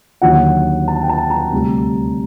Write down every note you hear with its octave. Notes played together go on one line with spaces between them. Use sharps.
D#2 D3 F#3 F#5
A5
G5
A5
A#5
D2 C3 G3